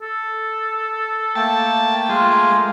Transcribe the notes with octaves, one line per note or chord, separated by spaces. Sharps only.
A4
A3 A#3 G5 A5
G#3 F4